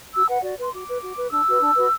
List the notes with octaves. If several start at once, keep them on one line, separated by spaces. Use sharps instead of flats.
F#4 E6
B4 F#5
F#4 D5
B4 C6
F#4 D6
B4
F#4
B4
D4 E6
F#4 B4
D4
F#4 B4